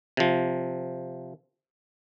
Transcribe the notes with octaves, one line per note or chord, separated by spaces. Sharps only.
C3 F3